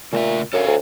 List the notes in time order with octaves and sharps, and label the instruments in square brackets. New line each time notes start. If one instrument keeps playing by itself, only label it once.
[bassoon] A#2 [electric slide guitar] C#3 A3 E5
[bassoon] F#2 [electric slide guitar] A4 C#5 F5
[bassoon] D2